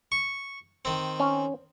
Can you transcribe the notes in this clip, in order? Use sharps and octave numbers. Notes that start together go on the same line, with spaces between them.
C#6
D#3 C4
C#4